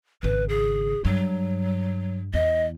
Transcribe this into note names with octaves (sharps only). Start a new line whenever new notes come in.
G#1 C#3 B4
G#4
G2 F#3
E2 D#5